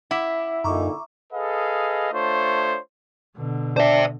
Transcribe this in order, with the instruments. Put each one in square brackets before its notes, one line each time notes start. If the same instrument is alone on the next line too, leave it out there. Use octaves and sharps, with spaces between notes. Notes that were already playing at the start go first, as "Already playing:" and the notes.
[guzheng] E4 [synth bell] F#5 D6 B6
[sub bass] F#2 [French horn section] A#2 D3 D#4 [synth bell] A#5 C#6 D6
[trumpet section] G#4 A4 B4 D#5 F5
A3 D4 F4 C5 C#5
[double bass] B2 D3
[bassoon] D4 [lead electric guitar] C5 E5